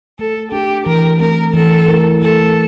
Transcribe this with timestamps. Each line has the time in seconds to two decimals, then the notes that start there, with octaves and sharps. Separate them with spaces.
0.19 A3 A4
0.52 D4 G4 A4
0.86 E3 A#4
1.20 A3 C4 A#4
1.54 E3 A4
1.88 A3 E4 A#4
2.22 A3 A4